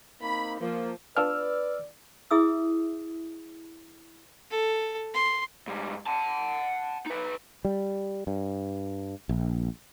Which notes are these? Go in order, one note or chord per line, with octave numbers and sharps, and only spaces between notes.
A#3 C4 D#4 B5
F3 A#3
B3 D4 F4 B4 D5 E6 F6
E4 G#4 E5 D#6 E6
A4
C6
G#2 G3
F#5 A5
D#4 B4
G3
G2
A#1